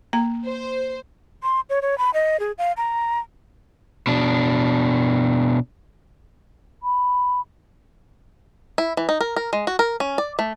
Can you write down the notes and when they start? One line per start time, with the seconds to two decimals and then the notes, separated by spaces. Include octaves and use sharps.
0.13 A#3 A#5
0.46 C5
1.43 C6
1.70 C#5
1.82 C#5
1.98 B5
2.14 D#5
2.40 G#4
2.58 F5
2.77 A#5
4.07 B2 D4
6.83 B5
8.78 E4
8.97 E3
9.09 D#4
9.21 A#4
9.36 A#4
9.53 G#3
9.67 F#4
9.79 A#4
10.00 C#4
10.18 D5
10.39 A3